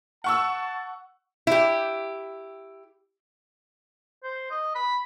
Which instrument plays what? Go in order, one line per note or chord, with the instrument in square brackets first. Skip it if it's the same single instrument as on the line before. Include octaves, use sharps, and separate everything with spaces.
[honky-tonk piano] F#5 C#6 E6 [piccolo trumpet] A5
[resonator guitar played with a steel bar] E4 G4
[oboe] C5
D#5
B5